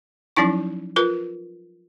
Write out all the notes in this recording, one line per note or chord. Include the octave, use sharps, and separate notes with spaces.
F3 F#3 C#4 D#4 E4 C#6
F4 A#4 B4